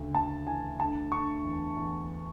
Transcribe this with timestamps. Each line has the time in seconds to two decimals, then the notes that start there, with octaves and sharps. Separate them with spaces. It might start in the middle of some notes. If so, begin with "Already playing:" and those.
Already playing: D2 C#3
0.15 D2 A5
0.47 E3 G#5
0.80 D3 A5
1.12 D3 C#6
1.45 E2
1.77 E2